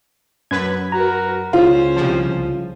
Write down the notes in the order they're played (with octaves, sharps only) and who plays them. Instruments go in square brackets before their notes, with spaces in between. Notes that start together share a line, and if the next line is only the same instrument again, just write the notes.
[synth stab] F#2 B4 [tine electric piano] G#6
[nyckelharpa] F#4 A#4 [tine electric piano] A#5
[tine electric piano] C#2 C#3 [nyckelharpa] C#4 C5 [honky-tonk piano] F4
[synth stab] C2 F3